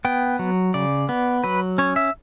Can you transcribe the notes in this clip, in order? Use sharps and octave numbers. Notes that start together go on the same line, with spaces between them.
B3 G5
F#3
C#3 D5
B3
F#3 B4
C#4 C#5
E5